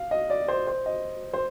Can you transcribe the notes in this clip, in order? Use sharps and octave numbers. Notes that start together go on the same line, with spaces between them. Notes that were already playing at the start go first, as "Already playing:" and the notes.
Already playing: F5
D#5
D5
C5
C5
D#5
C5